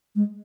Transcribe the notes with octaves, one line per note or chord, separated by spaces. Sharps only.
G#3